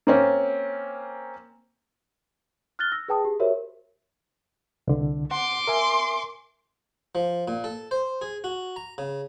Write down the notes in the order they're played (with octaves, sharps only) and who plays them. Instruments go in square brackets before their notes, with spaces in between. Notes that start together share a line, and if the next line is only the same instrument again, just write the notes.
[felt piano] A#3 C4 C#4
[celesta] F6 F#6 A6 G7
E6 A#6
G#4 B4 G5 A5 D#6
G4 G#4
F#4 G4 A#4 C5 C#5 E5
[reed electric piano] C2 D3
[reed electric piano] F#5 [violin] C6 D6
[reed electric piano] A#4 E5 G#5
[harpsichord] F3
A#2
A4
C5
G#4
F#4
A#5
C#3